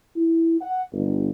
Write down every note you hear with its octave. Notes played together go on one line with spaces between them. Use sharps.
E4
F#5
G1